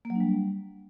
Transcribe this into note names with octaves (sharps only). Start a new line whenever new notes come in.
A#3
F#3
D4
G3